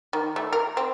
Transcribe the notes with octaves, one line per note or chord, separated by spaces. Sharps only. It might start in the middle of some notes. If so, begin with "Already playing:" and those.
D#3
A3
A#4
C4